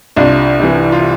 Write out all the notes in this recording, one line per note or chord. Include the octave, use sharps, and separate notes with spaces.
C2 D4 F4
C3 E3
F4